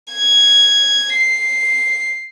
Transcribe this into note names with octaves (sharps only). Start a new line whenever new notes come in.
G#6
C7